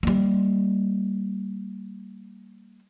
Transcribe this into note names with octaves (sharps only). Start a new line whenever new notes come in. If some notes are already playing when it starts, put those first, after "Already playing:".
G3 A#3